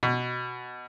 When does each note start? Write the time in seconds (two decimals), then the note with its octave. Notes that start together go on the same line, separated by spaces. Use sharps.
0.03 B2